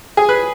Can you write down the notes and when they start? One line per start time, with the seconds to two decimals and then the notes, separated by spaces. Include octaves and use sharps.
0.17 G#4
0.29 B4